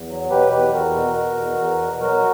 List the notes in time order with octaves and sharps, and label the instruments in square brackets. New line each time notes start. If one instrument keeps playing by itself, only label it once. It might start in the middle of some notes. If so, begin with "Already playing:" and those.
Already playing: [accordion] E2
F#3
B2 G4 B4
E2 G4 B4
E2 F#4 A#4
B2
B2
E2
E2
B2
F#3 F#4 A#4